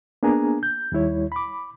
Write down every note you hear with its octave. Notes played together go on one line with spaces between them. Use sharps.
A#3 B3 D4 G#4 G#5 A#5
G6
D#2 G3 E4 C#5
B5 D6